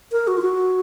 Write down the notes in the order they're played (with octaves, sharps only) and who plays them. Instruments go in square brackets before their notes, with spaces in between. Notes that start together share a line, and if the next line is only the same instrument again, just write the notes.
[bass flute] A#4
F#4
F4
F#4